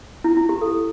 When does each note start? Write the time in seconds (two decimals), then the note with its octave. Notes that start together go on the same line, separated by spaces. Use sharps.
0.24 E4
0.37 E4
0.49 G4
0.61 A4